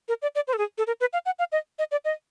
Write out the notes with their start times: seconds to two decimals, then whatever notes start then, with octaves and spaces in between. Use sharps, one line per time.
0.08 A#4
0.22 D5
0.35 D5
0.47 C5
0.53 A4
0.58 G#4
0.78 A4
0.87 A#4
1.01 B4
1.13 F5
1.26 F#5
1.39 F5
1.52 D#5
1.79 D#5
1.91 D5
2.05 D#5